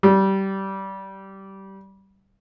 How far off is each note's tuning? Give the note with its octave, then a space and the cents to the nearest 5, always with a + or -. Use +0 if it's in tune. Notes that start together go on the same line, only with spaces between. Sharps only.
G3 -20